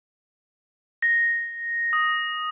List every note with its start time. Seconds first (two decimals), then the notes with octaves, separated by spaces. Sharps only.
1.02 A#6
1.93 D#6